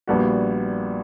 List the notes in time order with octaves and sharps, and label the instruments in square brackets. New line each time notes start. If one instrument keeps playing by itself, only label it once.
[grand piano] A#1 A#2 G3 B3 F#4